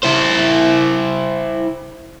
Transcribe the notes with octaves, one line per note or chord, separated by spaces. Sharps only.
E4 C5